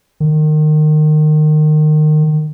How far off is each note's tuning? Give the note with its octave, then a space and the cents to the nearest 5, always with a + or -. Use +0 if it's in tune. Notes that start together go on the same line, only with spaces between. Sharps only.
D#3 -25